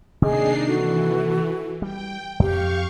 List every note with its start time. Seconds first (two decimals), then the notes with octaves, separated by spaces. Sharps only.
0.22 C3 D#3 A#3 D4 D#4 G#4 D#5 C7
0.68 E3 F#4 A4
1.82 G3 G5
2.40 F2 G4 F5 C#6